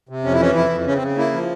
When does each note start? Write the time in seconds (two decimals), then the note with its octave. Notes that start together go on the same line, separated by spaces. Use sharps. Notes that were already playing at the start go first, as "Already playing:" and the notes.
0.09 C3
0.24 F2 C#4
0.33 E4
0.40 E3 C#4
0.55 F2 E4
0.70 F2
0.86 C#3 C#4
0.96 C4
1.02 C#3
1.17 A#3 E4
1.33 F3